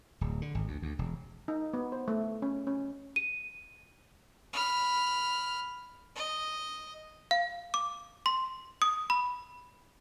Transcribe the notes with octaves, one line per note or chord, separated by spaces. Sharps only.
D1
D3
G#1
D2
D2
E1
D#4
B3
C5
A3
C#4
C#4
D#7
B5 F6
D#5
F5
D6
C6
D#6
B5